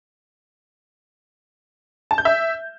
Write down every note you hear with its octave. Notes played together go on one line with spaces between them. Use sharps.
A5
G6
E5